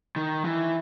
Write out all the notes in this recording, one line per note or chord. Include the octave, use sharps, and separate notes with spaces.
D#3
E3